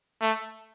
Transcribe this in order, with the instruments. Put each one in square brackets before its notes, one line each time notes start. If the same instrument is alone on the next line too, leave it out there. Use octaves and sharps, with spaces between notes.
[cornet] A3